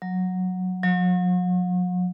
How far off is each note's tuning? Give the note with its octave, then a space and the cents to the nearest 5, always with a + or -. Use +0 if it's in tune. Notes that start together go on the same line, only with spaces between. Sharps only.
F#3 -10
F#3 -45